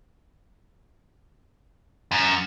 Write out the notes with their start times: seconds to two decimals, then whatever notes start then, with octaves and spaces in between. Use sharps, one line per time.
2.11 F#2